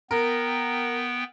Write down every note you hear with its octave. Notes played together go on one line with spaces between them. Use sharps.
B3 A#4 G5